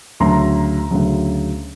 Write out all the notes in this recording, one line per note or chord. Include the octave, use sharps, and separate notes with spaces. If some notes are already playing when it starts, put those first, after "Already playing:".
D2 C#3 F#3 A#5 C6
D2 C#3 F#3